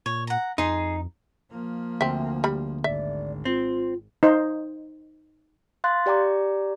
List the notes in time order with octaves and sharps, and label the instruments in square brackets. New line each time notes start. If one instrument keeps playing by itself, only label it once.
[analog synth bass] A#2 [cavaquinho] C#5
[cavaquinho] F#5 A#5
[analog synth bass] F2 [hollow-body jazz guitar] D#4 [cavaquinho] G#4 C6
[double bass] F3 A#3
[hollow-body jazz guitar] D2 [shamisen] C4 E5
[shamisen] G3 B5
[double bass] G#1 [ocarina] D5 [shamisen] E5
[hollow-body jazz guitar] C4 [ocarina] F4
[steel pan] D#4 C5
[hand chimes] F5 C6 F#6 A6
G4 D5 G5 A#5 D6